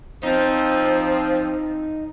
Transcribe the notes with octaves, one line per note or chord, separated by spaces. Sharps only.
F3 C4 D#4